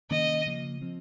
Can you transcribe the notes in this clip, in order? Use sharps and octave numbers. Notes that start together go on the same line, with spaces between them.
C3 D#3 A#3 C#4 D#5
C#3 F3 A#3
F3 C4